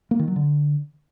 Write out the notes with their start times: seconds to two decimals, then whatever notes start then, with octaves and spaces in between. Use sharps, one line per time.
0.11 A#3
0.19 D#3
0.28 F#3
0.36 D3